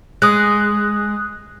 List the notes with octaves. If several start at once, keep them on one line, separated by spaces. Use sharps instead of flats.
G#3 D#6 F#6